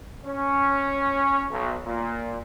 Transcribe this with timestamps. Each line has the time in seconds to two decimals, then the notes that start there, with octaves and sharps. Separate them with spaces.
0.25 C#4
1.50 B1
1.84 A#2